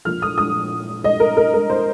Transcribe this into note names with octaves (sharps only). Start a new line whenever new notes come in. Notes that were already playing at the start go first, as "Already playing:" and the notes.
A#1 A#2 A#3 F6
D#6
D#6
D#5
A#4
A#4
A#4
C5